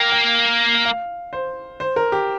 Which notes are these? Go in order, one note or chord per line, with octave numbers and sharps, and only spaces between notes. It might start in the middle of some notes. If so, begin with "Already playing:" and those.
Already playing: A#3 G5
G5
F5
C5
C5
A#4
G4